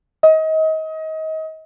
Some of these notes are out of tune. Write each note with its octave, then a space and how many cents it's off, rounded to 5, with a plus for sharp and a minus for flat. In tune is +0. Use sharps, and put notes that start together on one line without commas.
D#5 +30